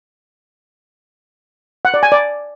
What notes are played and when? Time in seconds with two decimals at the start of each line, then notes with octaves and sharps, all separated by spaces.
1.85 F#5
1.94 D5
2.03 G#5
2.12 D5